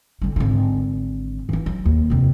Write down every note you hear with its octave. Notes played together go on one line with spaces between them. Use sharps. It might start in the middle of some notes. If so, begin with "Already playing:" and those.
D3 G3
G#1 D3
E3 E4
F#3
D#2
F2 C3